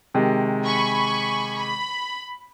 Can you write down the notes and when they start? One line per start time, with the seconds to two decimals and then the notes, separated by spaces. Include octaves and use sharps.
0.14 C3 D#3 G#3
0.65 G#5 B5 C#6
1.56 B5